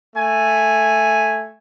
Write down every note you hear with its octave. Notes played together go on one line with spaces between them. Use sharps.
A3 G#5